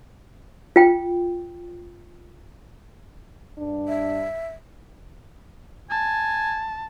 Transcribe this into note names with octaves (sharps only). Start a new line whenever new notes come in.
F4 G5
G2 D4
E5
G#5 A5